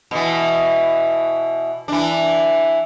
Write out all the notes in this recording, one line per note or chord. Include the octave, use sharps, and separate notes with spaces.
B2 E3
E3 D4